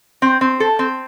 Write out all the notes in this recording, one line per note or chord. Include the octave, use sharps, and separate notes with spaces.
C4
C4
A4
C4